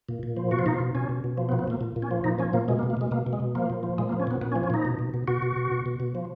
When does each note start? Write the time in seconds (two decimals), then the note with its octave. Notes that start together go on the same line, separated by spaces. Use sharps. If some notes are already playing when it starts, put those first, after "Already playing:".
0.09 A#2
0.23 A#2
0.37 F3
0.51 B2 F#4
0.59 F4
0.66 B2 D#4
0.74 F4
0.80 B2
0.95 B2 C#4
1.09 B2
1.24 B2
1.38 F3
1.49 B3
1.52 A#2
1.59 B3
1.67 A#2 A#3
1.81 A#2
1.96 A#2
2.02 C#4
2.11 F3
2.24 A#2 D#4
2.39 F3 C#4
2.53 A#2 A#3
2.68 B2 G#3
2.79 A#3
2.83 B2
2.90 A#3
2.97 B2 G#3
3.11 B2 A#3
3.26 B2
3.33 G#3
3.40 B2
3.55 F3 A#3
3.70 A#2
3.83 F3
3.98 A#2 G#3
4.09 A#3
4.12 F3
4.20 C#4
4.27 A#2 B3
4.41 A#2 B3
4.52 C#4
4.56 F3
4.63 C#4
4.70 A#2 D#4
4.85 B2
4.99 B2
5.14 B2
5.28 B2 F#4
5.42 B2
5.56 B2
5.72 B2
5.86 B2
6.00 B2
6.15 F3